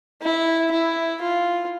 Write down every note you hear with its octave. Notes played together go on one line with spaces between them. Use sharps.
E4
E4
F4